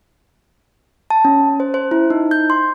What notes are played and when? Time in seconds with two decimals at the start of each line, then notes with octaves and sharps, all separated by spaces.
1.10 A5
1.25 C#4
1.60 C5
1.74 C5
1.91 E4
2.10 D#4
2.31 G6
2.50 C6